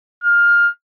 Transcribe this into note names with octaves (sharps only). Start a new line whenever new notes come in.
F6